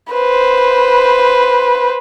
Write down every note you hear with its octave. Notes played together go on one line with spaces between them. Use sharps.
B4 C5